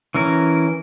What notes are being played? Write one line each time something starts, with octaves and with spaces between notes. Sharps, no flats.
E3 C#4 A#4